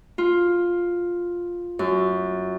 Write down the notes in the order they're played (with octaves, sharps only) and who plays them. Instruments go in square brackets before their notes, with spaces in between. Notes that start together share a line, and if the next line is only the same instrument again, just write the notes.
[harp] F4
F#2